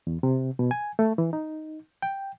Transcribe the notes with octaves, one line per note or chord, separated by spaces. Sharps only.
E2
C3
B2
G#5
A3
E3
D#4
G5